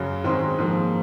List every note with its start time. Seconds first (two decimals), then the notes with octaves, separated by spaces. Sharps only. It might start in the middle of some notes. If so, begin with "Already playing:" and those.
Already playing: F#2 C#3 F#3
0.24 G#2 D#3 G#3 C4
0.59 G#2 F3 A#3